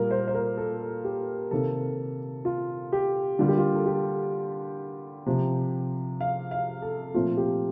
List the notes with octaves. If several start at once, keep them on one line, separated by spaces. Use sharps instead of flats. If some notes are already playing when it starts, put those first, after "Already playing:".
Already playing: A#2 G3 A#3 A#4 F5
C5
C5
A#4
A4
G4
C3 D#3 A#3 A4
F4
G4
D3 G3 A#3 F4
G4
F4
A4
G4
C3 F3 C4
F5
F5
A4
A#2 F3 A3 C4 F4
G4